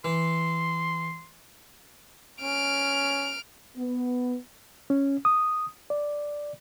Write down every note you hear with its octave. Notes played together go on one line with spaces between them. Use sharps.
E3 C6
C#4 F6 D7
B3
C#4
D#6
D5